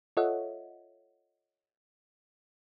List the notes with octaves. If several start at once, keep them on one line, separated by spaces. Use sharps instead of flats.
F4 A4 C#5 D#5 E5 F#5